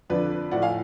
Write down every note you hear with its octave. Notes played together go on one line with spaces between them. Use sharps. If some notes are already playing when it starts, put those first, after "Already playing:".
F2 D3 F3 B4 D5
A2 F3 D5 F#5
F5 G#5